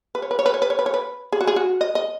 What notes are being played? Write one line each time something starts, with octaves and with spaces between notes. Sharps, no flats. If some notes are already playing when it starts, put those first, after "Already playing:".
B4
C#5
B4
C#5
B4
C#5
B4
C#5
B4
C#5
B4
G#4
F#4
G#4
F#4
D#5
D#5